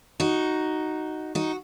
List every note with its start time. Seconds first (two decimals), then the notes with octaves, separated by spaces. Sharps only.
0.20 D#4 F#4
1.35 D#4 F#4